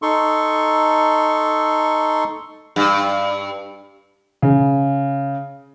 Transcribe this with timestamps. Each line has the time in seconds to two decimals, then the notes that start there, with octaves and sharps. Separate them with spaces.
0.02 D#4 A4 C6 C#6
2.76 G2
4.42 C#3